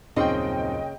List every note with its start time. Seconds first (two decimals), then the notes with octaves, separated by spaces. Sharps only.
0.16 D#1 F#2 C#3 C4 D#4 D#5 G5 C6